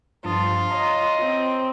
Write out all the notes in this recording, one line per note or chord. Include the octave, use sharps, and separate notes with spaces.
G2 F3 F4 A5 D#6
C#5 D#5 A#5
C4